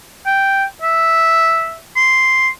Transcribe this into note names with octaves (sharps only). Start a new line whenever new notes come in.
G5
E5
C6